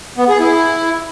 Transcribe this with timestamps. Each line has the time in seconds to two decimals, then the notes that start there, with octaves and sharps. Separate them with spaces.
0.18 B3
0.29 G#4
0.40 E4